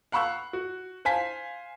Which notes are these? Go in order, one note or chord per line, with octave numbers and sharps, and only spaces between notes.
F5 F#5 B5 C#6 E6 F#6
F#4
C5 F5 G#5 B6